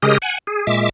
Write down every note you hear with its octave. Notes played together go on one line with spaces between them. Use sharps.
C#3 G#3 G4 G#4 A#4 D#6
F#5 G#5
G#4
A#2 G#3 E5 D6